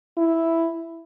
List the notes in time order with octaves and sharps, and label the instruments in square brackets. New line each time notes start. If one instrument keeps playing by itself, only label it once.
[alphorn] E4